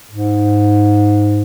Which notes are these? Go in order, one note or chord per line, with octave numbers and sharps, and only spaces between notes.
G#2